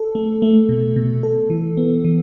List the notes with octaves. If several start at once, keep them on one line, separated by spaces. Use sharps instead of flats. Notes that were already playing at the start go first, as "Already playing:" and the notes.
Already playing: A4
A3
A3
B2
B2
A4
E3
B3
E3